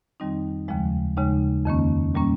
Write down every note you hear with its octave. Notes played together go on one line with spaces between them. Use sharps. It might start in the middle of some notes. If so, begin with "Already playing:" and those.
F2 D#3 G3 C4 D#4
D#2 C#3 F3 G#3
D#2 C#3 G#3 D#4
F2 D#3 A#3 C#4
A#2 G3 A#3 C#4